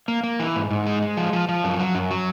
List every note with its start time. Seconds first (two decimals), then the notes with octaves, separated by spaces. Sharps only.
0.08 A#3
0.23 A#3
0.40 E3
0.56 G#2
0.71 G#2
0.87 G#3
1.02 G#3
1.17 F3
1.33 F3
1.49 F3
1.64 F#2
1.80 F#3
1.95 F#2
2.11 F#3